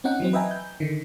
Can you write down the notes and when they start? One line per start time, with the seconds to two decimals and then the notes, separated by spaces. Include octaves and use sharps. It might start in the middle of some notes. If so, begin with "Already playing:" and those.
0.04 C4 C#4 D#4 F#5 G5
0.20 E3 F#3 C4
0.33 B4 D#5 E5 G5 G#5 A#5
0.51 G6
0.80 D3 D#3